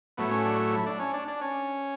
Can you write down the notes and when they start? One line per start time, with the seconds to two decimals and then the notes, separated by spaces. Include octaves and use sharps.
0.17 A2 F#3 A3 B3
0.31 C#4
0.45 D4
0.72 E4
0.86 D4
1.00 C#4
1.14 D4
1.28 D4
1.41 C#4